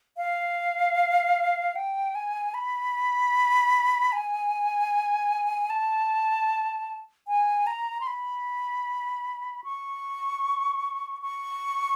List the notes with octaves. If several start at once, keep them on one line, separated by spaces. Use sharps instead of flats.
F5
G5
G#5
B5
G#5
A5
G#5
A#5
C6
B5
C#6
C#6